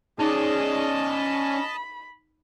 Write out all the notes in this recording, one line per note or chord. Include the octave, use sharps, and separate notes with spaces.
C#4 D#4 G#4 D5 D#5 A5
B5